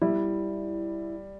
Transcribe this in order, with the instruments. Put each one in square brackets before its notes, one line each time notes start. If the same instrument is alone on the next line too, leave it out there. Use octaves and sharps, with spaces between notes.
[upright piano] G3 [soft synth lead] E4